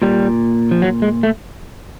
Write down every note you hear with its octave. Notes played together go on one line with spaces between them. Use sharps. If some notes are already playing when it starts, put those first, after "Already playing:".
A#2 G3
F3
F#3
G#3
A3